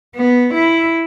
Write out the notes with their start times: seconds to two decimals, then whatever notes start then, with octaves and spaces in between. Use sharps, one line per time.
0.15 B3
0.54 E4